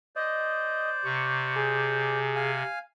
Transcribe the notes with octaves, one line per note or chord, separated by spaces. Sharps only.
C5 D5 D#5
C3 C#6
G#4
F5 G#5